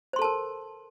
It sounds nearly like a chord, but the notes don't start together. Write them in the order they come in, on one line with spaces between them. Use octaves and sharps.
C5 C6 A4 A5 A#4